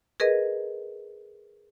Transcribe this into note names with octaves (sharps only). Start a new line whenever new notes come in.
G#4 A#4 B4 D#5